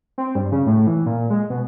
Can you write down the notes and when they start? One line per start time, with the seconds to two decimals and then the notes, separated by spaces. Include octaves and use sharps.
0.18 C4
0.35 G2
0.52 C#3
0.66 A2
0.87 E3
1.06 A#2
1.30 G#3
1.50 B2